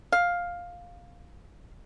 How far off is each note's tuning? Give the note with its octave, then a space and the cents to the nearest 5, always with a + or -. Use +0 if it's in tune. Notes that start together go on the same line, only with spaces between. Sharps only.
F5 +10